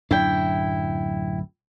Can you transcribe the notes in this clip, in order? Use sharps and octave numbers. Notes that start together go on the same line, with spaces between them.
D1 F#2 D4 E4 G5